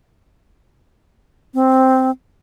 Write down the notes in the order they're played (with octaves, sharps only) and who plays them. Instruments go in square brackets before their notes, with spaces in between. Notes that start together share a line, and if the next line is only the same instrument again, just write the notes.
[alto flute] C4